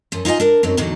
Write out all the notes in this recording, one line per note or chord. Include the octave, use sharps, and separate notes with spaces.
F#2 F3
D#4 F4 G4 D#5 G#5
D4 A#4
F#2 F#3 C4 D#4
E2 A2 D3 F#3 D#4